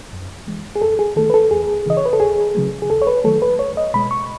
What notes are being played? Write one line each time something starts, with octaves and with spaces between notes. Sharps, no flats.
F#2
E3 G#3
G#4
F#2 A4
G#4
D#3 A3 A4
B4
A4
E2 G#4
C#3 E3 D#5
C#5
B4
A4
D#2 G#4
C#3 F#3 A3
G#4
D#2 A4
C#5
B4
D#3 F#3 A3 A4
B4
C#2 C#5
D#5
B2 G#3 B5
C#6